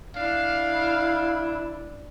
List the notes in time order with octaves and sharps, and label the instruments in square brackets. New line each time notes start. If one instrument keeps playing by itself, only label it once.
[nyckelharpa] D4 [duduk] E4 [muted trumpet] F5